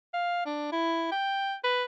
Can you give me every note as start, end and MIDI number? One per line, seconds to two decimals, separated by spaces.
0.14 0.41 77
0.46 0.67 62
0.72 1.11 64
1.11 1.55 79
1.64 1.83 71